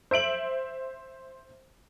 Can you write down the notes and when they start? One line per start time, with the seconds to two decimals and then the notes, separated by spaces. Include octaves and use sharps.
0.11 C5 E5 D7 F#7